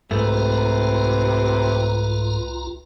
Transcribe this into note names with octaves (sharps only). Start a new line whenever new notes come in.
C2 G#2 C3 A3 F4 B4 A#5